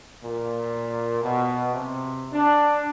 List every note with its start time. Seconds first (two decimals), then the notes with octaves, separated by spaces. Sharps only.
0.23 A#2
1.23 B2
1.74 C3
2.32 D4